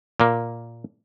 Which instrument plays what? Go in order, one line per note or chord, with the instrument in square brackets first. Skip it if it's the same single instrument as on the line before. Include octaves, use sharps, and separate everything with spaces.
[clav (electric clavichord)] A#2 A#3